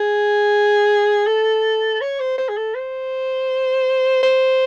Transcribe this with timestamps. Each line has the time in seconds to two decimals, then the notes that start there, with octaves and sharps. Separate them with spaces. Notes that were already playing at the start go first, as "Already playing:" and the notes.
Already playing: G#4
1.27 A4
2.01 C#5
2.20 C5
2.38 C5
2.49 G#4
2.57 A4
2.75 C5
4.23 C5